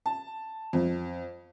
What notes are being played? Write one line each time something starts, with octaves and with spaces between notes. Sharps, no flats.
A5
F2